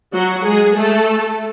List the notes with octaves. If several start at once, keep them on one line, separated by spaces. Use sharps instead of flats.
F#3 F#4
G#3 G#4
A3 A4